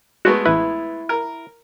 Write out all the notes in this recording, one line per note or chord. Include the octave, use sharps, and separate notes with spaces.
G#3 A3 B3 F#4
A1 E4 B4
A#4